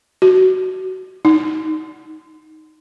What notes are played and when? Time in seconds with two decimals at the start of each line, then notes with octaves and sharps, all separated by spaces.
0.22 F#4
1.25 D#4